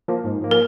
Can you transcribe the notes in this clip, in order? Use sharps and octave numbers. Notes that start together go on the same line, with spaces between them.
F3 A#3
G#2
F3 A#3
A#4